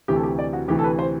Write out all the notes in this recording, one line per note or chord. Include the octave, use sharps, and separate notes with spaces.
D2 C3 E3 G4
A4
G4
D5
F#4
D2 C3 E3 G4
A4
B4
C5